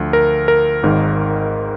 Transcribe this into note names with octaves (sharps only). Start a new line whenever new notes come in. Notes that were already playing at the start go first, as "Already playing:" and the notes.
Already playing: D2 D3 F3
A#4
A#4
G#1 G#2 D#3